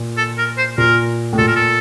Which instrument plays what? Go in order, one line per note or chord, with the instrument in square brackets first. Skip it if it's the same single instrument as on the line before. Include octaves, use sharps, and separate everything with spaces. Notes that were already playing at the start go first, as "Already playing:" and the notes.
Already playing: [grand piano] A#2
[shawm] A4
A#4
C5
[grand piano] A#2 [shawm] A#4
[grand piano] A2
[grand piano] A#2 [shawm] A4
[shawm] A#4
A4